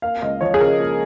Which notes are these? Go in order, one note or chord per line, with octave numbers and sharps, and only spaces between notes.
A#3 F5
C#2 D#5
F3 C#5
G#4
C#3 A#4
A#3